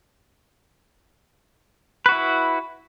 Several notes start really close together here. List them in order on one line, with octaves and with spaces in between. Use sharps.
B4 F#4 E4